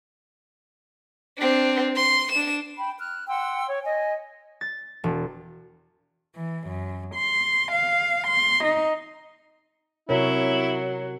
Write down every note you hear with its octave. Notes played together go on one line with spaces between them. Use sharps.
C4 D4
C6
D4 E7
G5 B5
F6 F#6
F#5 G5 C6 E6
C#5
D#5 G#5
A6
E1
E3
F#2
C6
F5
C6
D#4
C3 F#3 E4 A#4 C#5